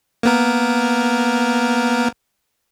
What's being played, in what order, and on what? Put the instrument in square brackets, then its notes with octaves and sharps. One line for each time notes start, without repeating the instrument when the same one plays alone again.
[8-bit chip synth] A#3 B3 A#4